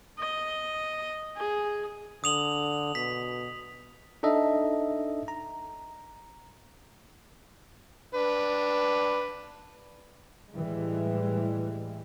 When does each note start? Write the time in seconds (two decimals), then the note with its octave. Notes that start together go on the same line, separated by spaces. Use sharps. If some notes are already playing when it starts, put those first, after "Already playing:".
0.19 D#5
1.36 G#4
2.24 D3 D#6 F7 F#7
2.95 B2 B6
4.23 D4 D#4 A4 D#5 E5
5.28 A#5
8.15 D4 B4
10.53 A2 E3 G3 G#3